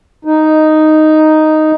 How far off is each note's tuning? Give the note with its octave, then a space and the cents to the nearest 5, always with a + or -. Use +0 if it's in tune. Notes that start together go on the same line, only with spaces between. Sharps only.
D#4 +0